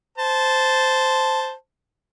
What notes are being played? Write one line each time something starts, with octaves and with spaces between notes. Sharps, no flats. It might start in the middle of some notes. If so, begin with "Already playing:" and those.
C5 A5